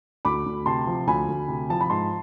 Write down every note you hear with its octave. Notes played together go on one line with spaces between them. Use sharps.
D2 B5 D6
D2
C3 A5 C6
F3
D2 G#5 B5
D2
C3
F3 A5
B5
G#2 A5 C6